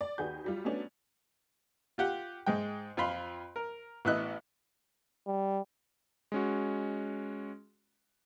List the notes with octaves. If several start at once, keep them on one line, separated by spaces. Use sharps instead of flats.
D5
D#2 F#4 G#4 B4 G6
F#3 G3 F4
F#3 A3 B3 C#4 D4
F4 G4 F#5
G#2 G#3 G5
F2 F4 B5 C6
A#4
A1 B3 E4 D#5 F#6
G3
G#3 C#4 F#4